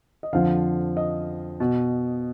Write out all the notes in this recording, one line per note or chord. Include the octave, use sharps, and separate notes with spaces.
D#5
F2 D3 F3 F5
D#5
B2